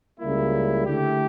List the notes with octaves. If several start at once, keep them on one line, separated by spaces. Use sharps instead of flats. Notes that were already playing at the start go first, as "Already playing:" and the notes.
C#2 C#3 G3 A#3 E4
D3 A3 E4 G4